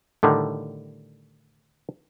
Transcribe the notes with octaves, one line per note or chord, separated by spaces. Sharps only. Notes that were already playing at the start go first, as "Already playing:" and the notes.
A2 D3 D#3 G3